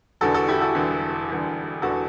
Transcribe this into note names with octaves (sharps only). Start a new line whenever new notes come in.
E1 E2 D3 F#4 A4
F#4 A4
E4 G4
F#4 A4
E1 E2 D3
E1 E2 D3
E1 E2 D3 F#4 A4